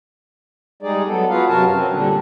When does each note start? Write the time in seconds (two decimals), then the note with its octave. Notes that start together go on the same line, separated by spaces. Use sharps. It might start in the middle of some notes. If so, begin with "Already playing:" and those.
0.83 G3 G#3 D#4 G#4 D5
1.07 F#3 B3 A4
1.30 F4 F#4 G#4 B4 F5
1.48 F#2 C3 F#3 F#4 A#4 A5
1.72 C4 C#4
1.90 A#2 D3 G3 D4